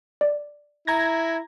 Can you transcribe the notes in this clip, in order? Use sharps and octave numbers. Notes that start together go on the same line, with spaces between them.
D5
E4 A#5 G#6 A#6